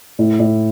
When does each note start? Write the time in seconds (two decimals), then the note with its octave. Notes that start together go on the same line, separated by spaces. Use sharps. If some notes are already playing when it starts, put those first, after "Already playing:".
0.19 A2
0.40 A2